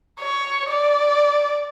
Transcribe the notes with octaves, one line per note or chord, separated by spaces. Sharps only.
C#5
D5